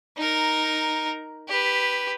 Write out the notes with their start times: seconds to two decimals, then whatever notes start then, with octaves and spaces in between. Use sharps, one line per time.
0.17 D#4 A#4
1.48 G4 B4